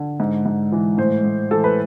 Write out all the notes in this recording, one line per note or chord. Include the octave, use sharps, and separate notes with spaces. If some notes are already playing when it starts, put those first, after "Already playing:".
Already playing: D3
G#2
G#2
E3
A2 C5
A2
E3 A4
B4